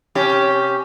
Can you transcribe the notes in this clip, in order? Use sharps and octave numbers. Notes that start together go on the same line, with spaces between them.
C3 C#4 G4